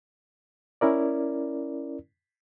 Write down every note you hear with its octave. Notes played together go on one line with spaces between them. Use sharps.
C#4 E4 A#4 D5